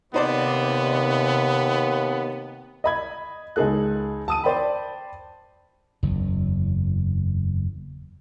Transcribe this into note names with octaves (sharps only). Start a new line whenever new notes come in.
D#2 C3 B3 D#4 C5 D5
D#5 B5 G#6
C#2 D#4 G#4 A4 F#6
A5 D#6 D#7
C5 D5 G5 A5 B5
F#1 E2